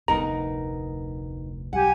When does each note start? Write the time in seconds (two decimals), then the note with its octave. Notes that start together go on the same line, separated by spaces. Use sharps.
0.08 F1 D2 B3 D#4 A#4 A#5
1.73 B1 G4 F#5 G#5